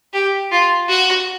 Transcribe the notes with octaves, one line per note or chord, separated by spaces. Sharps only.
G4
F4
F#4